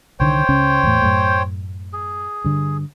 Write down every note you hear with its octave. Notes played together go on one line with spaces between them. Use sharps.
C2 D3 D#3 C5 C#5 G5
C#2 C#3 C#4
E2 A2
F#2 A2 A3
G#4
G2 D3